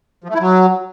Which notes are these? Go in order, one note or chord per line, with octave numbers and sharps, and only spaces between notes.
F3
A3
E4
F#3